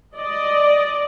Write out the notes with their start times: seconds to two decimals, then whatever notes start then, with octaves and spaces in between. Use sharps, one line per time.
0.18 D5 D#5